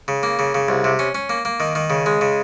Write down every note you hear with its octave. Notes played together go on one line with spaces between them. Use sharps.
C#3
A#3
C#3
C#3
C2
C3
C#4
C#4
A#3
A#3
D#3
D#3
C#3
G#3
C#3